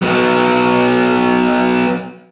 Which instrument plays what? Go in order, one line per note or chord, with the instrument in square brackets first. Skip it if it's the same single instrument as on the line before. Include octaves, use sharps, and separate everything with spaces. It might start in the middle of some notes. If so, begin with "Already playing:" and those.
[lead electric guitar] F#3 B3